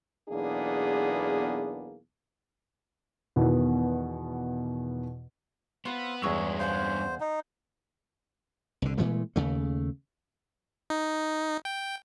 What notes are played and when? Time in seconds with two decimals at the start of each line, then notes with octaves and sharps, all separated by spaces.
0.29 B1 E2 A#3 B3 D4 G#4
3.36 E2 B2 D#3 E3 B3
5.85 B3 C4 F4 B4
6.22 E2 G2 G#3 C#4 B4 C#6 E6
6.60 C5 F5 F#5 G#5
7.20 D#4
8.82 C2 D3
8.98 A#2 E3 G#3 A3
9.36 D#2 C#3 A3
10.90 D#4
11.65 G5